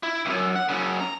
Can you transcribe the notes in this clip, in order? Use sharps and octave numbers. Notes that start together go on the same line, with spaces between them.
E4
C#2 F#2
F#5
F#2 C#3
A#5